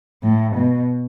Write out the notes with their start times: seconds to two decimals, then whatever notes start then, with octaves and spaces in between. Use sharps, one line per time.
0.23 A2
0.56 B2